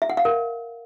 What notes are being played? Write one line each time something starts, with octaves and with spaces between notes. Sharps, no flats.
E5
F#5
F5
A#4